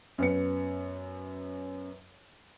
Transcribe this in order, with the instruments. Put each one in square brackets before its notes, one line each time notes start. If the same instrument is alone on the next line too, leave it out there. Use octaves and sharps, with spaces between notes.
[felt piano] F#2 B3 C#7